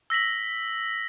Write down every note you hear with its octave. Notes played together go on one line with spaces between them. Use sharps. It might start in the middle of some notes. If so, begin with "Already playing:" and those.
E6 A#6 B6 F#7